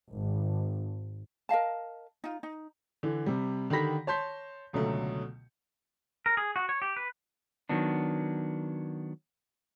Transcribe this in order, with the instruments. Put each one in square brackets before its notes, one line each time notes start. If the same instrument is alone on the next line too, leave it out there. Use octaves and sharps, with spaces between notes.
[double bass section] G#1
[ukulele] A#4 D#5 F5 A5
D#4 F4
D#4
[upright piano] D3 E3
C3 G3
D3 D#3 G4 B5 A#6 B6
C#5 A5 C6 G6 B6
C#2 B2 D3 F#3 A3
[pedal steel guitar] A#4
G#4
F#4
C#5
G4
B4
[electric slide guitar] D#3 F#3 B3 D4